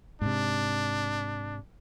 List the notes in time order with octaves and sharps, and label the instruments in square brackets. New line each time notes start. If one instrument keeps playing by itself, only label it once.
[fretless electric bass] G#2 C3 [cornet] D4